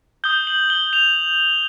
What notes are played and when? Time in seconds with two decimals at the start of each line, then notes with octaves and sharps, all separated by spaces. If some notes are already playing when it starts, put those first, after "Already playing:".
0.24 D#6 G6 G7
0.47 F#7
0.70 G7
0.93 F7